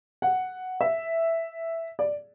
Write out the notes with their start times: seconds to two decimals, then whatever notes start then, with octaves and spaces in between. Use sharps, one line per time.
0.22 F#5
0.81 E5
1.99 D5